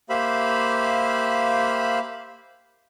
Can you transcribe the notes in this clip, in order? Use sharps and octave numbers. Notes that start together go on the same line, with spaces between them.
A#3 G4 C5 E5 F5 B5